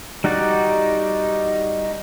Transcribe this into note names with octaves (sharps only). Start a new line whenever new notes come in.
G3 D#4 F#4 D5